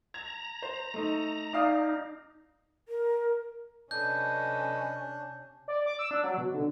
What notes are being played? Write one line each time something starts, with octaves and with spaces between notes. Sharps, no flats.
A#5 G#6
C5
A3 D#4
D#4 D5 F5 D#6
A#4
C3 C#4 D4 A4 B4 D#5 G6
D5
D6
E6
D4
F#3
B2
D3